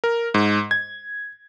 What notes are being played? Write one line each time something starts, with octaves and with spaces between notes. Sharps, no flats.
A#4
G#2
G#6